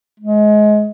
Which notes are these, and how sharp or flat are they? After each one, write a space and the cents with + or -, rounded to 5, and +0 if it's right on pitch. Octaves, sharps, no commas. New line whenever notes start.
G#3 +25